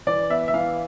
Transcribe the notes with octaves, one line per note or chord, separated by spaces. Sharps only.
E3 D5
B3 E5
E5
E3 F5